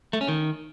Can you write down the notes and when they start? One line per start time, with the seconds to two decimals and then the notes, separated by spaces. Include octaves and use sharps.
0.13 A3
0.21 C#4
0.28 D#3